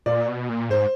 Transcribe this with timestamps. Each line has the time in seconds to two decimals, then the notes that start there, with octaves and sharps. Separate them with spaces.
0.06 A#2 D5
0.28 B2
0.49 A#2
0.70 G#2 C5